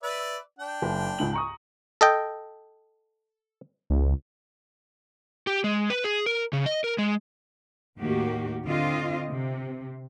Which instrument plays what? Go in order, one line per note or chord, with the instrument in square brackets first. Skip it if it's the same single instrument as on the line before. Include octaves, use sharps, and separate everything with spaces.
[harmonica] B4 D5 E5
D4 G5
[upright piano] F#1
C#2 G#2 F#7
A#5 C#6 D#6
[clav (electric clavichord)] A4 D#5 G5
[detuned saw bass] C#2
[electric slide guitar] G4
G#3
B4
G#4
A#4
C#3
D#5
A#4
G#3
[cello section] D#2 A2 D#3 A#3 F#4 G4
D3 C4 F4 D#5
C3